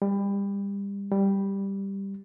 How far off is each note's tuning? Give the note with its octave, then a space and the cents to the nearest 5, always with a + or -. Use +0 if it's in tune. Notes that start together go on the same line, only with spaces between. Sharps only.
G3 +30
G3 +5